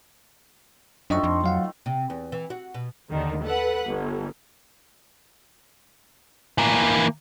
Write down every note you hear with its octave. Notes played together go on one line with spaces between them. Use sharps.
F#2 D#3 F3 A3 D4 D#5 C#6
F2 C6
F#3 F5 F#5
C3
E2
E3
F#4
B2
D#2 D3 D#3
A4 B4 F#5
G1
E3 A#3